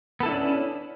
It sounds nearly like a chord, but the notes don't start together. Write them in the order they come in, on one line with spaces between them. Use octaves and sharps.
B3 A4 E4 D4 C#4